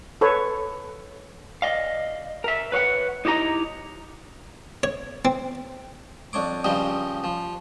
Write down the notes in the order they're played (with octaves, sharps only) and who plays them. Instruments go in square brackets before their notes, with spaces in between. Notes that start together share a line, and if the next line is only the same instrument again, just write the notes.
[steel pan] A4 B4 C#5
[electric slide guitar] D5 D#5 F5
A#4 E5
B4 C#5 F5 F#5
D#4 E4 G4 D#5 A#5
[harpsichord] C#5
C4
F2 D4 C#5 D6
G2 C#3 F3 G3 D#5
F3